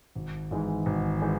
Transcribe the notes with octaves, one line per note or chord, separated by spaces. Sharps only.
G#1
G#2 E3 G#3 D#4
G#1
E3 G#3 D#4